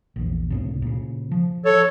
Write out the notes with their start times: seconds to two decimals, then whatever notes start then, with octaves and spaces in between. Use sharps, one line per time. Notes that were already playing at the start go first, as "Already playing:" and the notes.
0.16 A#1 E2
0.50 C#2 A2 C3
0.82 A#2 C#3
1.31 F3
1.65 A4 C#5